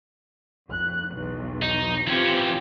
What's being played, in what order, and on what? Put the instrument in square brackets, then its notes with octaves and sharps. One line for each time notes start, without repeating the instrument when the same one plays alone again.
[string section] F2 F#6
B1 E2
[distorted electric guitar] D#4
[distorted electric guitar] E3 C#4 [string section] C4 F4 G4